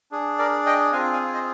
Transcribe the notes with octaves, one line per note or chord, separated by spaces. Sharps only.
D4 G#4
A#4 D5
D#5 G5
C4 F4 G#4 F5 G#5
F5 G#5
C5 D#5